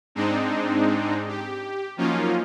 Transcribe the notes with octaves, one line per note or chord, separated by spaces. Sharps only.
G#2 G#3 C4 D4 D#4
G4
F3 F#3 A#3 C#4 D#4 F4